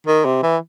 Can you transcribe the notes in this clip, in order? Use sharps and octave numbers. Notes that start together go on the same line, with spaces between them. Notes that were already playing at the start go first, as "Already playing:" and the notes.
D#3
C3
E3